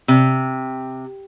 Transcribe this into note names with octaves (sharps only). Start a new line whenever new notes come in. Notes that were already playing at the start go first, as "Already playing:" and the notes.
C3